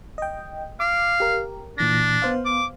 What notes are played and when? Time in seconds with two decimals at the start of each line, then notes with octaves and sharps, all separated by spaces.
0.18 D#5 G5
0.80 F5 D6
1.20 G4 A#4
1.78 A#2 E3 D4 A#6
2.22 B3 C5 F5
2.45 D6